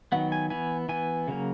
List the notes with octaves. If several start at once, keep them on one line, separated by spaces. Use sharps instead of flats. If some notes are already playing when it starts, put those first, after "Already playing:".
D#3 F#3 B3 F#5
G#5
E3 B3 G#5
E3 B3 G#5
C#3 F#3 A#3